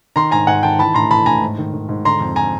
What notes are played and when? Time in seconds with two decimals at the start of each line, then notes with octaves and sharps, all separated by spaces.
0.16 D#3 A#5 C6
0.31 G#2 G#5 A#5
0.47 G#2 F#5 G#5
0.63 D#3 G5 A5
0.79 E3 A5 B5
0.95 A2 A#5 C6
1.11 E3 A5 B5
1.26 A2 G#5 A#5
1.42 G#2
1.58 D#3
1.74 D#3
1.89 G#2
2.05 D3 A#5 C6
2.21 F2
2.36 G#5 A#5